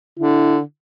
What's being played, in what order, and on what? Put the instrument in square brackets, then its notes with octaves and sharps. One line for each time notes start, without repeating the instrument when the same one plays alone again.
[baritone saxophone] D3 [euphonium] E4